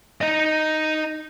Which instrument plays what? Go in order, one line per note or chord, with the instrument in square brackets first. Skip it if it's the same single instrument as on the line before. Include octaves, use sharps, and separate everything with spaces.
[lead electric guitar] D#4 D#5